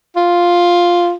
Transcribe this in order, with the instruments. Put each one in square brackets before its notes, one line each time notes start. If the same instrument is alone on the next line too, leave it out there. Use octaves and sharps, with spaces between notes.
[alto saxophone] F4